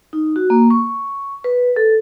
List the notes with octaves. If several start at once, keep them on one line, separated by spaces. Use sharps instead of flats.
D#4
F#4
A#3
C#6
B4
A4